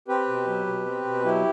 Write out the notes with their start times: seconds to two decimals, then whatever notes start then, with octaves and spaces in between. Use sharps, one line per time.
0.08 C4 G4 B4
0.28 B2
0.46 F#3
0.66 B2
0.85 C4
1.04 B2
1.24 F#3 E4 G4